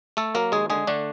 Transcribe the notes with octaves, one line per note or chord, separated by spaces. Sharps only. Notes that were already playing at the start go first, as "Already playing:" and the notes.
A3 A4
F#3 A#3 A#4
D#2 G#3 G#4
D3 G#3 G#4
D3 A3 D4